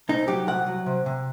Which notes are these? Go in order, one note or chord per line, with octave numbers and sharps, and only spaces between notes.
C2 D#4
F#3 G4
C2 F#5
F#3
C3
C3